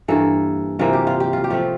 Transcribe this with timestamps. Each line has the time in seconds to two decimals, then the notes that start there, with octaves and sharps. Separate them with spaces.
0.08 G2 E3 A#3 A4
0.79 C3 E3 A#3 F4
0.93 G4
1.07 F4
1.20 G4
1.33 F4
1.44 G4
1.50 F3 A3 C4 F4